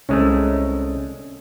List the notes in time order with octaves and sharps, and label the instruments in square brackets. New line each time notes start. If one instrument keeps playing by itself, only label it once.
[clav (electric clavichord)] C2 G#3 A3 [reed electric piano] C#4